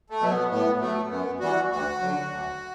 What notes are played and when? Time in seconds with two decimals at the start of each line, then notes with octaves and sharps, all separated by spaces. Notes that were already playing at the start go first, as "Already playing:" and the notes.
0.10 A3
0.20 B2 F#3
0.30 B3
0.50 A2 B3
0.80 F#3 A3
1.10 F#2 B3
1.40 E3 G3 F#4
1.71 D2 F#4
2.01 D3 F#3
2.30 D2